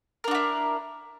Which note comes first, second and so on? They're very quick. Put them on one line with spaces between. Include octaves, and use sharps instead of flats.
A#4 D4 F#4 E4